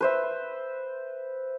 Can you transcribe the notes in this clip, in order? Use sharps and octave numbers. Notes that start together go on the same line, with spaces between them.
B4 C5 E5